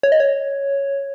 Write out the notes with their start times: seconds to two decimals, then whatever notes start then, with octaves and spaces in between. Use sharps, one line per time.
0.03 C#5
0.12 D#5
0.20 C#5